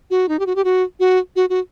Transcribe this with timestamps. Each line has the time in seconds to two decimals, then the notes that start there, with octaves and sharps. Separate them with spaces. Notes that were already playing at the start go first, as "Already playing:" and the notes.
0.10 F#4
0.29 D#4
0.39 G4
0.46 F#4
0.56 G4
0.64 F#4
1.00 F#4
1.36 F#4
1.49 F#4